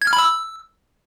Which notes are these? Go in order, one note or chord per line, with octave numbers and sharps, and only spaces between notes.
G#6
F6
B5
E6